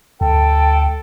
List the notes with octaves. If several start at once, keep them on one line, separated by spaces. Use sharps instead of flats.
D2 A4 G5